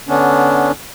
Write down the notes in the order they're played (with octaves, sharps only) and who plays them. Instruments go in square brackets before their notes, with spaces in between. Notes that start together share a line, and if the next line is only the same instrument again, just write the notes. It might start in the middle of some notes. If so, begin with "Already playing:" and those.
[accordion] D3 B3 C#4 D4